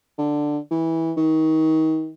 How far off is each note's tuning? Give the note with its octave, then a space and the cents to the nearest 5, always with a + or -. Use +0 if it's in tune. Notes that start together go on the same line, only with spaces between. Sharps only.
D3 +10
E3 -15
D#3 +30